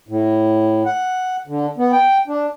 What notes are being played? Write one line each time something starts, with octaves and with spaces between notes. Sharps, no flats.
A2
F#5
D3
B3
G5
D4